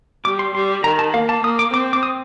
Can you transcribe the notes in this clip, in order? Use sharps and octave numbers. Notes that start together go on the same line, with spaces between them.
G3 D6
C6
G3 C6
D#3 A#5
A5
A#3 F5
A5
A#3 D#6
D6
C4 D6
D6
D#6